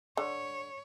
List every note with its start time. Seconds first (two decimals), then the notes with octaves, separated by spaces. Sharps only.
0.17 D3 C#5